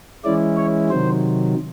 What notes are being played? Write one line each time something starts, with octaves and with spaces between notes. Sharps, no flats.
E3 G#3 C#4 E4 D5
C#5
C3 D#3 F#3 C5